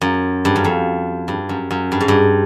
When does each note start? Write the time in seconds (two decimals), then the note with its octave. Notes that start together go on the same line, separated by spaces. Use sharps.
0.01 F#2
0.45 G2
0.56 F#2
0.64 F2
1.28 G2
1.49 F#2
1.71 F#2
1.92 G2
2.01 G#2
2.08 G2